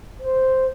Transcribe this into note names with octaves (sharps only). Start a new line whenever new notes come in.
C5